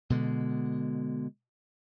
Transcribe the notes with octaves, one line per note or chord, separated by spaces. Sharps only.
B2 D3 G#3